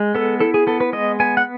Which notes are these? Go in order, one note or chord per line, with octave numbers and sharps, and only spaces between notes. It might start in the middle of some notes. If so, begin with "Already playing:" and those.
Already playing: G#3
B3 A4
E4 A4
G#4
B3 A4
B4
G#3 D#5
B3 G#5
F#5